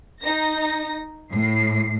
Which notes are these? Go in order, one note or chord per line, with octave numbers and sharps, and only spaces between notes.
D#4 A#6
A2 C7